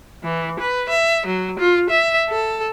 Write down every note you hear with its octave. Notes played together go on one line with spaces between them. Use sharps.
E3
B4
E5
F#3
F4
E5
A4